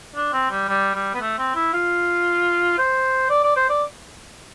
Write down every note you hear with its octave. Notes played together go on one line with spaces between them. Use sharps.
D4
C4
G3
G3
G3
B3
A3
C4
E4
F4
C5
D5
D5
C5
D5